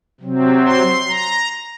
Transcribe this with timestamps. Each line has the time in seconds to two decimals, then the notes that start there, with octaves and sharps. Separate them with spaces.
0.20 C3 F#3 C4
0.65 C6
1.09 A#5